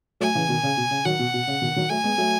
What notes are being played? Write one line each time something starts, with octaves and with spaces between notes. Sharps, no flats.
F#3 A3 G#5
C#3 E3
B2 D#3
C#3
B2
C#3
D#3 F#3 F#5
B2
B2
C#3
B2 D#3
D#3 F#3
F#3 A3 G#5
G#3 B3
F#3 A3